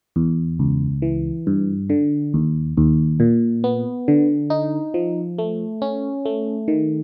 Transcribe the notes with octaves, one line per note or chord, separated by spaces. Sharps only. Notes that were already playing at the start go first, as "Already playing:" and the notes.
E2
C#2
E3
G2
D3
D#2
D#2
A#2
B3
D3
D#4
F3
A3
C#4
A3
D#3